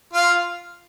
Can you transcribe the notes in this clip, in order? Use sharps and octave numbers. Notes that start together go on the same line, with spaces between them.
F4